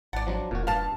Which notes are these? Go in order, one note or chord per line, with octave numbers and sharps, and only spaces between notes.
G#1 D5 F#5 A5
F3 F#3 D4
E1 A#2 F#4
G2 F5 A5